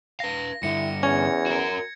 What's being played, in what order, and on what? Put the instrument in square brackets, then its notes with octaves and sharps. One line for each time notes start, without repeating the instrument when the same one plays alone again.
[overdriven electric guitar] B4 F5 [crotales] A#6
[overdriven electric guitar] G2 D3 [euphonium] E4 [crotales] C#7
[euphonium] E2 [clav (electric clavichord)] C#4 [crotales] G#6
[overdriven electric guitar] F#4 A#4